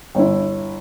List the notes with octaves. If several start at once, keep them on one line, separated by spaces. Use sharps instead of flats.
G1 E4